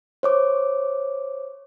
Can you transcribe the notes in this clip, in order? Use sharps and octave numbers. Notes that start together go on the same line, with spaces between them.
C5 C#5 D6